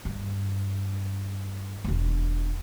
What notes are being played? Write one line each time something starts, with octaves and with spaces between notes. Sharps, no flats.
G2
E1 D4